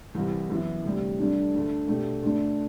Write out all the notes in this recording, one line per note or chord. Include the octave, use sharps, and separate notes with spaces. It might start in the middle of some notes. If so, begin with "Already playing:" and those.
C2 C3 E3
F#2 E3 B3 E4
D2 C3 G3
G2 D3 A3 D4
D2 D3 A3
B2 A3 D4 G4
D2 D3 A3 D4